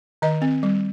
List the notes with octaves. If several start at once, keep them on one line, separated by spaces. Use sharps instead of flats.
D#3 D#5
C4
G3